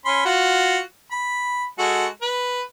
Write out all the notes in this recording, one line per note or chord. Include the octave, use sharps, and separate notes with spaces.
C#4 B5 C6
F4 F#4
B5
G#3 F#4 A4
B4